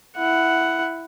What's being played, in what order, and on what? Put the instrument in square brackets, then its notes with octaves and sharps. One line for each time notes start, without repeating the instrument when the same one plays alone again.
[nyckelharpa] E4 F#5